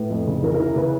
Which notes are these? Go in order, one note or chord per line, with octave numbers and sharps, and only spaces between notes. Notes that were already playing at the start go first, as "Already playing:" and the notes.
Already playing: A2 B4
F2
C#3
E3 A#4
A#4
E3
C#3 B4